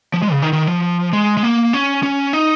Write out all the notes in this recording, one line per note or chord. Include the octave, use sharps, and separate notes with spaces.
F3
G#3
C#3
D#3
D#3
F3
G#3
G#3
A#3
C#4
C#4
D#4